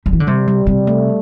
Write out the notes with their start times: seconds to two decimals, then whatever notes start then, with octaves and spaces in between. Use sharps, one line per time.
0.06 G3
0.13 E3
0.20 D3
0.27 C3 G3
0.48 G3
0.67 C3 G3
0.87 A3